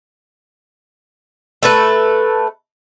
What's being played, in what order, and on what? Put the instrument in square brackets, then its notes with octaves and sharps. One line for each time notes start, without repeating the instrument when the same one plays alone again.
[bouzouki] A3 A4 B4